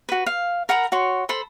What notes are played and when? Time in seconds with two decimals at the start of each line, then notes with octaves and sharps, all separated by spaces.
0.09 F#4 B4
0.26 F5
0.69 A#4 F#5 A#5 B5
0.92 F#4 C#5 C6
1.29 A4 C5 B5